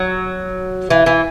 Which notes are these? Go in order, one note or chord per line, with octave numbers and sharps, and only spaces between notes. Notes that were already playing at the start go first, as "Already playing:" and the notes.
Already playing: F#3
E3
E3